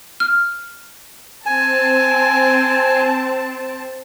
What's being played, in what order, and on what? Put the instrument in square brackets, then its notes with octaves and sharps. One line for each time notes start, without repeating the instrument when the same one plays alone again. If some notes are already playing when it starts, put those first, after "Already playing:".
[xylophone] F6
[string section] C4 A5 [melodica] G#5